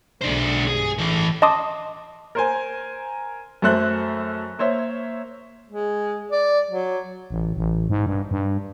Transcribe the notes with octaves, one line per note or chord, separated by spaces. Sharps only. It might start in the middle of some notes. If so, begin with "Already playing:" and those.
B1 D3 G#3 D4 C5
G2 G#4
E3 A4
D#5 A5 C6 D6 D#6
A#4 C5 G#5
F#2 A3 A4 C5 E5 F#6
A#3 C5 C#5 E5
G#3
D5
F#3
A1
A1
G#2
G2
G2